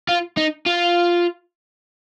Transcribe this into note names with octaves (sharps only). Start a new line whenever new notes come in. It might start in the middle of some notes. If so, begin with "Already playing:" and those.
F4
D#4
F4